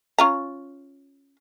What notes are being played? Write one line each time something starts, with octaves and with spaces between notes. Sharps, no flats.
C#4 F4 A#5